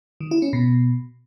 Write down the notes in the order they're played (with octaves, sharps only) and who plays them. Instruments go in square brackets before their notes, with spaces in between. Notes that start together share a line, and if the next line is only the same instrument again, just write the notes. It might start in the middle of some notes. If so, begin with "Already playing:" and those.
[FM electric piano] D#3
E4
C#4
B2